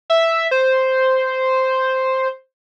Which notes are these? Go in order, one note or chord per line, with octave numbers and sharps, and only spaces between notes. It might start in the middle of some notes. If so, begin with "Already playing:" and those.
E5
C5